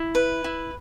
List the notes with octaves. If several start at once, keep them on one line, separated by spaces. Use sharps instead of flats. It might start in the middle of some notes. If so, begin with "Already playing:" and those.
Already playing: E4
B4
E4